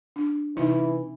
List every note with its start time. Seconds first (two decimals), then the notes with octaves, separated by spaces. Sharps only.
0.16 D4
0.57 C3 E3 D#4